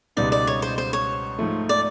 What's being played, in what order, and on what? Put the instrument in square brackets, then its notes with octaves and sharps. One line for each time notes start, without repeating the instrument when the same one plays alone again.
[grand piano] C#2 B2 G3 B3 D#4 [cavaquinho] D5
[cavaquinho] D5
C#5
C5
C5
C#5
[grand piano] G#2 F3 A3
[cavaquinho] D5